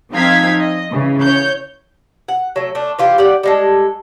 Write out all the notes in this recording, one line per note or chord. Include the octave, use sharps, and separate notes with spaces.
F3 C4 D#4 F5 G#6 B6
D#5
C#3 E3
C#5 G6
F#5
F#3 A3
A3 D4
E3 F4 G4
G4 D5 F#5
G3 G#3 A4